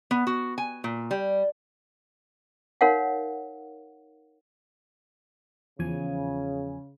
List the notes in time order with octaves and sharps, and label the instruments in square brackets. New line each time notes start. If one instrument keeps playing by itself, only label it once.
[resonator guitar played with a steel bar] B3
F#4
G#5
A#2
G3
[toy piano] D#4 A#4 C#5 F5 F#5
[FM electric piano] E2 F3 G#5 [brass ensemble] C#3